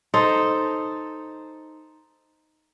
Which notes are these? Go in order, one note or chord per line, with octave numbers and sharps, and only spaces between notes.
D#4 A4 C5